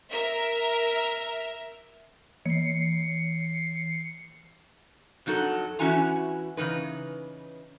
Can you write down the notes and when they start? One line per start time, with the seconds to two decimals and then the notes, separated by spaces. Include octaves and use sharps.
0.10 A#4 E5
2.46 E3 C7 C#7
5.26 F2 F#3 D#4 F#4 A4
5.79 E3 C#4 E4 F#4 G#5 A#5
6.57 C#3 E3 D#4 B4